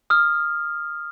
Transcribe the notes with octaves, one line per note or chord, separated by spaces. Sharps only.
D#6 F6